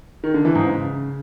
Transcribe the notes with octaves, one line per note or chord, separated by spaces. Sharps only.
D#3
D3
E3
G#2
C#3